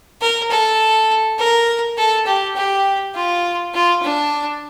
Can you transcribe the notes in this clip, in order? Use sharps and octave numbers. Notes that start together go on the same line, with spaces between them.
A#4
A4
A#4
A4
G4
G4
F4
F4
D4